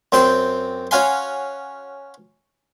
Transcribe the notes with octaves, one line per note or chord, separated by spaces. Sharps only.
F#2 C4 G5 C6
C#4 F#4 F5 G#5 C6